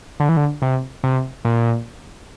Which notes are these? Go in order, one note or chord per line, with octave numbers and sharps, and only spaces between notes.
D3
E3
D3
C3
C3
A#2